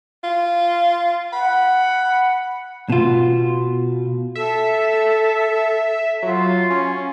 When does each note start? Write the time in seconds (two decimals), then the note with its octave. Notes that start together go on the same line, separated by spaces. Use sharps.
0.24 F4
1.33 F#5 B5
2.90 B2 F4
4.35 A4 E5
6.22 F#3 F4
6.70 C#4